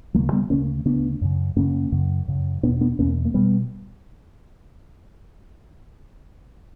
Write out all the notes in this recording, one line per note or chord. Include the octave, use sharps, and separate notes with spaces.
D2 C#3 F#3 A#3
G3 B3
D2 C#3 A#3 C#4
D2 C#3 B3 D4
F#2 C#3
F#2 C#3 A#3 C#4
F#2 C#3
F#2 C#3
E2 B2 B3 D4
B3 D4
E2 B2 A#3 C#4
A#3
B2 G3 B3